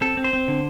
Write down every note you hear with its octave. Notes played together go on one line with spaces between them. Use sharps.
C4 A4
C4
C5
C4
D3